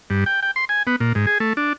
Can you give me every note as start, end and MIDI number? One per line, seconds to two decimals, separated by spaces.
0.10 0.24 43
0.26 0.40 79
0.43 0.51 79
0.56 0.65 84
0.69 0.83 80
0.87 0.96 59
1.00 1.13 46
1.15 1.26 44
1.27 1.38 68
1.40 1.53 57
1.57 1.73 62